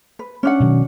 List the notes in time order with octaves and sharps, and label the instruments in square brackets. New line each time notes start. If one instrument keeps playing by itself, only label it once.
[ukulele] B4
C#4 D4 F#5
[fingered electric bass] B2 D#3 F#3